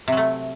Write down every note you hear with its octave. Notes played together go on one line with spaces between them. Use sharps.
C3 F#3 A3